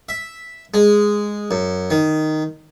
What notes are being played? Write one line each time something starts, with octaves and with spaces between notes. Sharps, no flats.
E5
G#3
F#2
D#3